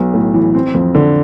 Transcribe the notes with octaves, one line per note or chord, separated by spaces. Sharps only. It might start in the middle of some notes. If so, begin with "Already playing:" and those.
Already playing: B1 B3
A2
E3
C4
F2
D3